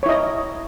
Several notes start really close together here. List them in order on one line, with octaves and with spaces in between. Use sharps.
C#5 E4 D#5